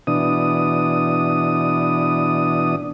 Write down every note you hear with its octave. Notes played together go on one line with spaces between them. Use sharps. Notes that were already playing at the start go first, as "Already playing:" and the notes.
B2 E3 D4 D#6